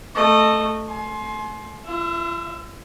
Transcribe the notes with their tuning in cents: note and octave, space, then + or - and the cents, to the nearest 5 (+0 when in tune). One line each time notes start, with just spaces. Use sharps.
A3 +0 D#5 -20
G#5 +40 C6 +15
F4 -45 E5 +15